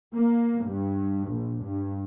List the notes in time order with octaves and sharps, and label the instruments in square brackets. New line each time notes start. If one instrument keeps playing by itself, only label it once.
[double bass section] A#3
G2
A#1
G2